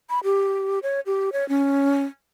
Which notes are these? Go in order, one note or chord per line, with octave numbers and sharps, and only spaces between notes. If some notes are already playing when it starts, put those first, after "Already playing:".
B5
G4
C#5
G4
C#5
C#4